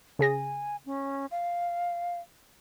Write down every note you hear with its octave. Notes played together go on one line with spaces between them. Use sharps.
C#3 G#4 G#5 A#6
C#4
F5